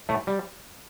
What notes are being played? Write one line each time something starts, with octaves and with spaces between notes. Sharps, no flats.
A2 A3
G3